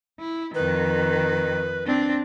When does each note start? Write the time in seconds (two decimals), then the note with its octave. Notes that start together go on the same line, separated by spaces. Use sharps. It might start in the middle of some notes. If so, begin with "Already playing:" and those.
0.20 E4
0.55 F2 D#3 B4
1.86 C4 D4